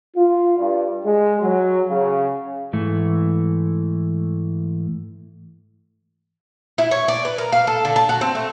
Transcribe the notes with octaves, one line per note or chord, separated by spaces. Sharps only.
F4
G2
G#3
F#3
C#3
G#2 E3 A3
E4
C#5
D5
B4
A#4
F5
A4
D3
A5
F#4
C4
A3